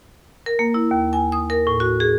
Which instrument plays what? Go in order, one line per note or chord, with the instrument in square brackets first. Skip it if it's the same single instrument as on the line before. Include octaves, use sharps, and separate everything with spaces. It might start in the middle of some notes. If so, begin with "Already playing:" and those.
[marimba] A#4
A#3
E4
D#2
G#5
D#6
A#4
A2
F#4
G#4